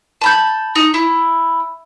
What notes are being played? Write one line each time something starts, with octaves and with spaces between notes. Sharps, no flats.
A5 B5 G6
D#4
E4